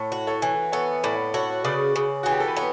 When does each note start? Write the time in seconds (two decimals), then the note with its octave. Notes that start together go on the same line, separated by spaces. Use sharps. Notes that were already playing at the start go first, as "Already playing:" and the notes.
Already playing: A2 A4 C#5
0.12 F#4
0.27 A4 C#5
0.42 E3
0.72 B3 A4 C#5
1.03 A2 B4 D5
1.34 F#4 A4 C#5
1.64 C#3 B4 D5
1.96 C#3
2.23 E3 F#4
2.31 G4
2.40 A4
2.48 B4
2.56 B3 A4 C#5